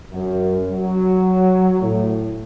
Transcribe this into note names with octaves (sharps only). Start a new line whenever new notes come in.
F#2
F#3
A2